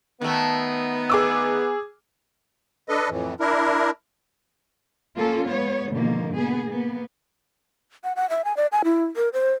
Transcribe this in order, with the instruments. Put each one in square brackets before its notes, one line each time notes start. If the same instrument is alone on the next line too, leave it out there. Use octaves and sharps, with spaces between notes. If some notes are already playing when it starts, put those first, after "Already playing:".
[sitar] D#3 A3 [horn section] B3
[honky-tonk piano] G#4 D6 E6
[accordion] D4 A4 B4 D#5
F2 A2 E3
D4 E4 A#4
[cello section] A#3 C#4 F4 A4
G#3 B3 C#5
G#2 B2 D3 D#3 F3 A#3
A#3 B3 G#4
A#3 B3
[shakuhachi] F#5
F#5
E5
G#5
D5
G#5
E4
A#4
C5